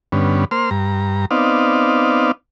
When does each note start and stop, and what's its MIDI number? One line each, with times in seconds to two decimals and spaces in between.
0.12 0.45 43
0.12 0.45 50
0.12 0.45 59
0.12 0.45 61
0.51 0.70 58
0.51 0.70 72
0.51 0.70 84
0.51 0.70 89
0.71 1.26 43
0.71 1.26 82
1.31 2.32 59
1.31 2.32 60
1.31 2.32 63
1.31 2.32 74
1.31 2.32 77